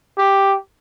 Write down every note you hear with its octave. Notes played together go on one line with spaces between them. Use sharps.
G4